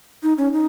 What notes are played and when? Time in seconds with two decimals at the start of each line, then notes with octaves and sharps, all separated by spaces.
0.23 D#4
0.38 C#4
0.53 D#4